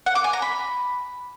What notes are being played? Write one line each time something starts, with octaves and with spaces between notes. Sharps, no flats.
F#5
D6
G#5
A#5
B5